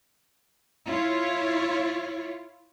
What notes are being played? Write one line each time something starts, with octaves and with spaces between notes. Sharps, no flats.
E4 F4 C#5